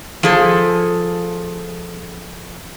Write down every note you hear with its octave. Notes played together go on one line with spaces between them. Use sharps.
F3 G#4 A4